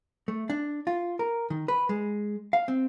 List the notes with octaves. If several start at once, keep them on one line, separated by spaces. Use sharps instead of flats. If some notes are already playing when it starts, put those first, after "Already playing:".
A3
D4
F4
A#4
D#3
B4
G#3
F5
C4